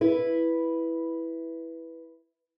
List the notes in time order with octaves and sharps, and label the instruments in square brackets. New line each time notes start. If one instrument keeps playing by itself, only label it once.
[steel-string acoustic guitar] E4 B4